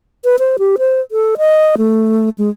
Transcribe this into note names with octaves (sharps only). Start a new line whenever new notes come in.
B4
C5
G4
C5
A4
D#5
A3
G#3